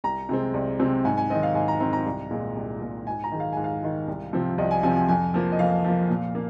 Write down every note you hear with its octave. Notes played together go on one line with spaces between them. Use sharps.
C2 A#5
C3 G#3 C4
C2
C3 G#3 C4
G#2 G#5
G#5
D#3 C4 D#5
F5
G#2 G#5
A#5
D#3 C4 A#5
A#5
C2
A#2 G#3
C2
A#2 G#3
G#2 G#5
A#5
D#3 G#3
F5
G#2 G#5
F5
D#3 G#3
C2
C3 F3 C4
C2 D#5
G#5
C3 F3 C4 G#5
G#5
F2 G#5
F3 A#3
D#5
F2 F5
F3 A#3
A#2
A#3